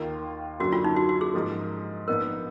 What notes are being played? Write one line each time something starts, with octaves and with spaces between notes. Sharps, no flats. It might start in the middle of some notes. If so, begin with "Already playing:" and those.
Already playing: D#2 D#3 A#3 F4 A#4
F#2 D3 F#3 A#3 F#4
F4
D#4
F#4
F#4
G#4
G#2 F3 A#3
A#1 A#2 F3 B3 D#4 A#4